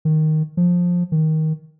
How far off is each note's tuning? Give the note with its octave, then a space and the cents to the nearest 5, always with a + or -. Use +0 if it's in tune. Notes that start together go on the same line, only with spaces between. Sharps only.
D#3 +0
F3 +15
D#3 +15